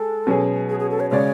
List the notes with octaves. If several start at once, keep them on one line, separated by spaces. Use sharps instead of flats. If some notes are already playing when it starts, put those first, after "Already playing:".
Already playing: G#3 A4
B2 F#3 C#4 G#4
G#4
G#4
A4
C#5
C#3 G#3 C#4 G#4 C#5 D5